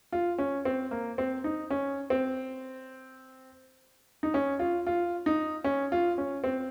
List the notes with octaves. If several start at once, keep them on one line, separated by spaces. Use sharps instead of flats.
F4
C#4
C4
A#3
C4
D#4
C#4
C4
D#4
C#4
F4
F4
D#4
C#4
F4
C#4
C4